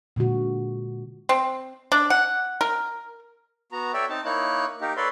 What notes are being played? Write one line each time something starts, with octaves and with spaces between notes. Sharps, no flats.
A#2 D3 G#3 F#4
C4
D4
F#5
A#4
B3 F#4 A#5
A4 C#5 D5 E5 G5
C4 D#4 A5
A#3 D#4 E4 C#5 F#6
A#3 D#4 G4 A#4
A4 B4 C#5 D5 B5 C6